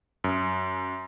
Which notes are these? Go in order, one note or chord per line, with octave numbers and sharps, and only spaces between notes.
F#2